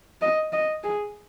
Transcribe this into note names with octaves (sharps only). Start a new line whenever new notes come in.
D#5
D#5
G#4